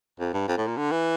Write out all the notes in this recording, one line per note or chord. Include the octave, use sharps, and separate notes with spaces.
F2
G2
F2
A2
A#2
D3
E3